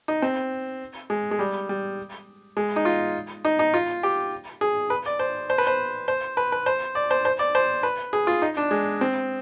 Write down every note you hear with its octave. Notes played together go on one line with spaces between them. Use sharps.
D#4
C4
G#3
G#3
G3
G3
G#3
D#4
F4
D#4
D#4
F4
G4
G#4
B4
D5
C5
C5
B4
C5
C5
B4
B4
C5
D5
C5
C5
D5
C5
B4
G#4
F4
D#4
D4
G#3
C4